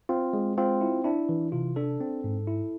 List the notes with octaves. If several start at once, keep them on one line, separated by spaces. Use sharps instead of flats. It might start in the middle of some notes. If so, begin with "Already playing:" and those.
C4 F4
G#3
C4 F4
E4
D4 E4
E3
C3 F4
D4 A4
C4
G#2
E4